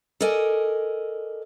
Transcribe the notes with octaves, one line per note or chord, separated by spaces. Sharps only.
A4 A#4 D5 D#5 G#5